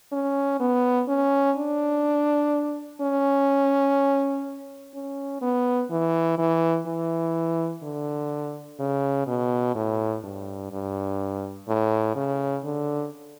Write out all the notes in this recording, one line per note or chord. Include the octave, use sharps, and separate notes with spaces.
C#4
B3
C#4
D4
C#4
C#4
B3
E3
E3
E3
D3
C#3
B2
A2
G2
G2
A2
C#3
D3